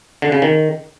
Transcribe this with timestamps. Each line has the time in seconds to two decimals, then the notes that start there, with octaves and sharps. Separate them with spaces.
0.22 D3
0.32 C#3
0.42 D#3